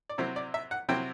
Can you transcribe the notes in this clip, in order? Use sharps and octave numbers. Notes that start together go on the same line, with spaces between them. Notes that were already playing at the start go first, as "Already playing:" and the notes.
D5
C3 F#3 C4 E4 C5
D5
E5
F#5
C3 F#3 C4 E4 G5